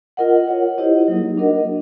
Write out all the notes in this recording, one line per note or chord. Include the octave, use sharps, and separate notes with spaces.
F4 A#4 D#5 F#5
F4 A#4 C#5 F#5
E4 G4 C5 D#5 F#5
F#3 A#3 D#4 G#4
D4 F#4 A#4 D#5 F#5